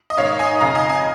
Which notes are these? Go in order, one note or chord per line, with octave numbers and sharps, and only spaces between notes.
D#5
G#2 D#3 C#5 F5
D#5 G#5
F2 C#3 F5 A#5
D#5 G#5
D#5 G#5